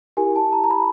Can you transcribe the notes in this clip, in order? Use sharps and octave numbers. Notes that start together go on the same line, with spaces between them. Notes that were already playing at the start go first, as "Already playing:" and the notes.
E4 G4 A#4 G#5
A5
A#5
A#5
B5